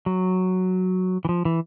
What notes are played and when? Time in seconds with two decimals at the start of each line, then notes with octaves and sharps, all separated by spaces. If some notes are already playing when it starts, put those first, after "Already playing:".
0.06 F#3
1.25 E3
1.29 F3
1.45 E3